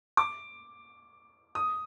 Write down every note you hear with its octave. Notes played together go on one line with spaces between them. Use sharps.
D6
D#6